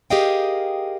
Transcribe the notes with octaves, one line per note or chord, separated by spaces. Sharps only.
G4 G#4 A#4 D#5 F5 G5